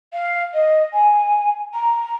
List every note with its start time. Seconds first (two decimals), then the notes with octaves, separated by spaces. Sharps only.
0.13 F5
0.54 D#5
0.93 G#5
1.73 A#5